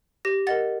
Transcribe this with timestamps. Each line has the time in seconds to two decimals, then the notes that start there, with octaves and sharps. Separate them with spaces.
0.25 G4 A#6
0.47 A#4 D#5 F#5 A6